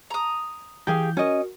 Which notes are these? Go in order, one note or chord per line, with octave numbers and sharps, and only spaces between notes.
A#5 D#6
E3 G4 G#4 F5 G6
C#4 F#4 A#4 D#5